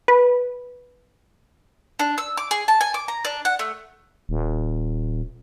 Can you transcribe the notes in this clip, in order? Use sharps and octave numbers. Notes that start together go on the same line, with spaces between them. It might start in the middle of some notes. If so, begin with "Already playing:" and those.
B4
D4
E6
D6
G#4
A5
G#5
D6
A#5
D4
F#5
A3
D#1